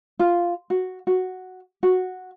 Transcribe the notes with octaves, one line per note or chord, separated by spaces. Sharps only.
F4
F#4
F#4
F#4